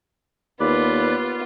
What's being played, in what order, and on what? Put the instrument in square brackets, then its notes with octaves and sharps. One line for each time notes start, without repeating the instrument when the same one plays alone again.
[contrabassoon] D#2 [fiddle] B3 F4 [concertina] B4 D5